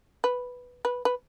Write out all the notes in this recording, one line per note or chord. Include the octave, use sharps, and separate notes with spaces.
B4
B4
B4